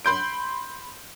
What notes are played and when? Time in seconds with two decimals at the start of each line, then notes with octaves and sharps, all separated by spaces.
0.05 B5 C6 G6 D7